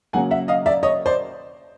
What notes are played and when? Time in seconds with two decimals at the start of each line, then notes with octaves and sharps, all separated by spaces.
0.13 C#3 F#3 A#3 F#5 G#5
0.31 E5 F#5
0.48 D#5 F5
0.66 D5 E5
0.83 C#5 D#5
1.06 C5 D5